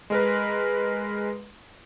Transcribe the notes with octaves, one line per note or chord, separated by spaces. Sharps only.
G#3 A#4 B4